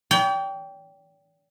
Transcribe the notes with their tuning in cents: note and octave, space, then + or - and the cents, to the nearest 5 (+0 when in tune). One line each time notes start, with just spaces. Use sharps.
D5 -45 G5 +0